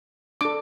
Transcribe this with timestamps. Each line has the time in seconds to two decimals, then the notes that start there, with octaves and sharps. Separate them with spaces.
0.41 D4 A4 D6